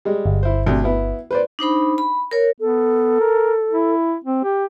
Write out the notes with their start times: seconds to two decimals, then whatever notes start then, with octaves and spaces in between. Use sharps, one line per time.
0.05 G3 G#3
0.26 G1
0.43 E4 C5
0.66 D2 C3
0.84 B3 E4
1.31 B4 C5 D5
1.59 D4 D#4 C5 B5
1.98 B5
2.31 A#4 C#5
2.60 B3 A4
3.20 A#4
3.71 E4
4.24 C4
4.44 G4